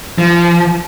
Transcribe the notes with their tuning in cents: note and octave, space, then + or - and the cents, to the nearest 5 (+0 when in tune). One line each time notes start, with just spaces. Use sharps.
F3 -30